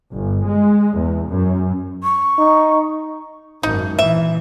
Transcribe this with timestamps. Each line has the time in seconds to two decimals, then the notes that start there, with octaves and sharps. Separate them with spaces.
0.11 G1
0.45 G#3
0.97 E2
1.28 F#2
2.04 C#6
2.38 D#4
3.63 G#1 F#2 D#4
3.99 A#2 E3 E5